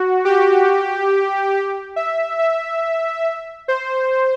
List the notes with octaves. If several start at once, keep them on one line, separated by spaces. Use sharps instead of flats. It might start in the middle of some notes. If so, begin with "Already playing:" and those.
Already playing: F#4
G4
E5
E5
C5